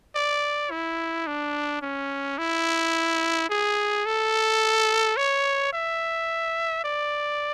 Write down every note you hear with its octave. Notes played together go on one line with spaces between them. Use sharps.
D5
E4
D4
C#4
E4
G#4
A4
C#5
E5
D5